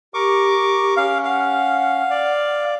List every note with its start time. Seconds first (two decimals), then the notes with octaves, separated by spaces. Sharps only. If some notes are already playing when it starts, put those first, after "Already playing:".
0.14 G4 A#4 C#6 D6
0.97 C#4 F5
1.25 F5 F#5
2.10 D5